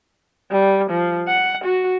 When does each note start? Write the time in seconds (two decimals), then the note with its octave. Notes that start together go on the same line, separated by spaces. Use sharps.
0.51 G3
0.91 F3
1.28 F#5
1.64 F#4